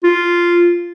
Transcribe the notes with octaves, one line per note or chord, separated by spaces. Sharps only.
F4